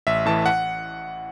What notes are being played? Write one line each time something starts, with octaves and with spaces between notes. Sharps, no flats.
A1 E5
A2 E3 A5
F#5